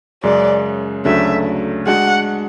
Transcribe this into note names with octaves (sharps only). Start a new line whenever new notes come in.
F#2 C#3 G#3 D5
D2 C#3 F#3 A3 D4 E5
G#3 D4 F#4 F#5